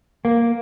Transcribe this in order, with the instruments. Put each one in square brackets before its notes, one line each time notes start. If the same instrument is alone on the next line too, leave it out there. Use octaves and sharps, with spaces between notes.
[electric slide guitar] A#3